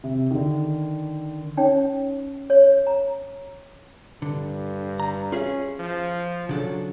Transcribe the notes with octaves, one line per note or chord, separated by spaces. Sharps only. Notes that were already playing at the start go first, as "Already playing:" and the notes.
C3
D3 D#3
C#4 D#4 C#5 G5
C#5
A#5
G2 D3
A#5
C#4 F4 G#4 E5
F3
C#3 F#3 D4 A4